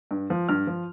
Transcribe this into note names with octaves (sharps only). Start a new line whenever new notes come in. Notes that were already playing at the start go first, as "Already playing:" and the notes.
G2
F3
G2 F6
F3